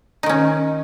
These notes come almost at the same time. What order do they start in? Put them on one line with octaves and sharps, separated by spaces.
D#4 D#3 C#4